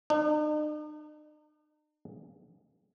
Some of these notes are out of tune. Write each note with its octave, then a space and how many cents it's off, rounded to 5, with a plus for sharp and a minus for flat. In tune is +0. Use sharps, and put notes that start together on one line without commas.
D#4 -45